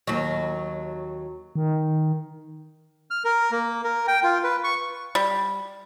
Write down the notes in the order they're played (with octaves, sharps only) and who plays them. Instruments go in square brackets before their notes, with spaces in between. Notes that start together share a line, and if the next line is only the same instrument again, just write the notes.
[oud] D#2 F#3
[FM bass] D#3
[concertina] F6
A#4
A#3
A#4
G5
F4
B4
C#6
[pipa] G3